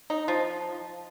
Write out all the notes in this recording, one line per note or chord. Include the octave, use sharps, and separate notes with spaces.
D#4
F3